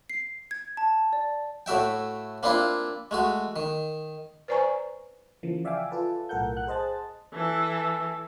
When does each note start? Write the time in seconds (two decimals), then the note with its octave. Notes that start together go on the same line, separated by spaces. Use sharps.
0.10 C7
0.51 G#6
0.77 A5
1.13 D5
1.66 A2 A3 F#4 E5 G5
2.43 A#3 C4 D4 E4 F4
3.11 G#3 A3 F#4
3.56 D#3
4.48 B4 C5 D5 G#5 A#5 C#6
5.43 C#3 E3 F3 A#3
5.65 D5 E5 F5 G5 G#5 D6
5.91 F4 A4 B4 A5
6.29 B1 A2 A4 A#4 F#5 G6
6.53 F#5 F#6
6.67 G#4 C5 D#5 A5 A6
7.33 E3 A4